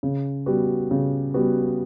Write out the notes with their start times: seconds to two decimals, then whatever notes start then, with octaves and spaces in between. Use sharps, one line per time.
0.03 C#3
0.46 G3 B3 F#4
0.91 C#3
1.34 G3 B3 F#4